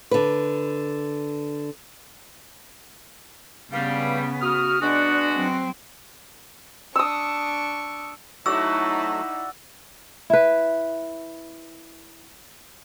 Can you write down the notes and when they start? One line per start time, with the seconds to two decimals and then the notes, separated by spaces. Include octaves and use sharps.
0.11 D3 B4
3.72 G2 C#3 G3 B3 F5
4.42 F#4 D#6 F6
4.81 G#3 B3 D4 F#4 D5
5.32 F#3 C4
6.96 D4 C#6 D#6 E6
8.46 F#3 A3 D#4 E4 F#4 D5 E6
10.30 E4 B4